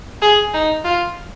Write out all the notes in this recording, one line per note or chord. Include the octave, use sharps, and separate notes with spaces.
G#4
D#4
F4